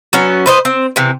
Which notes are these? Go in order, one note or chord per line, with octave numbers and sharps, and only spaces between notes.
F#3 B3 C#4
B4 C5 D#5
C4
C3 E3